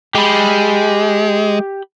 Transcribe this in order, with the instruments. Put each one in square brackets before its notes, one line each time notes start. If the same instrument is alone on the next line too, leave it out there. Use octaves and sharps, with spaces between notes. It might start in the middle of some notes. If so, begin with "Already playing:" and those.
[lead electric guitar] G#3 [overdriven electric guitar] G4 B5